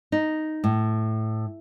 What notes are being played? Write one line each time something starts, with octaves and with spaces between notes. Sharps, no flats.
D#4
A2